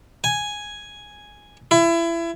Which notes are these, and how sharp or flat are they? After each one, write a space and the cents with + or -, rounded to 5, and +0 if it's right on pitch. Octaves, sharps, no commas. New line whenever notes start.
G#5 +0
E4 +30